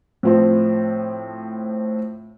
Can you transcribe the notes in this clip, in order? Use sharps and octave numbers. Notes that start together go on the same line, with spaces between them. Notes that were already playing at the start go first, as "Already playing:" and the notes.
A2 F3 C4